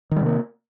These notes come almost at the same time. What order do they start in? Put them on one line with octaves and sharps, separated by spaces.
D#3 G3 C3 A#3